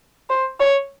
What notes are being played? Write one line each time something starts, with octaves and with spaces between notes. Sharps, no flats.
C5
C#5